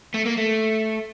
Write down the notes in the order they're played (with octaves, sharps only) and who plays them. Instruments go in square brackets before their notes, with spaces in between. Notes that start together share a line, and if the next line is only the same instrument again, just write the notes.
[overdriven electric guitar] A3
A#3
A3